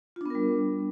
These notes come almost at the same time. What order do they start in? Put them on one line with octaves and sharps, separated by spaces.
F4 D4 B3 A#4 G3